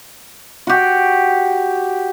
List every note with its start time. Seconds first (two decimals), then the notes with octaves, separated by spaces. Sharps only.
0.67 F#4 G4